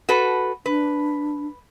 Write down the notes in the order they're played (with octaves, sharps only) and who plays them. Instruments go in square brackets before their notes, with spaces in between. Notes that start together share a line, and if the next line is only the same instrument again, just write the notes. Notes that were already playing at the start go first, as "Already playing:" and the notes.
[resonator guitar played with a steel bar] F#4 A4 B4
[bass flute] D4 [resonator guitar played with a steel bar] B4